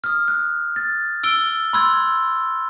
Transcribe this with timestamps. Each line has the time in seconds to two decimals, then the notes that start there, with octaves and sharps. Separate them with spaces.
0.04 D#6 F6
0.28 F#6
0.76 A6
1.23 E6 D7 G7
1.73 B5 C6 E6 F#6 G#6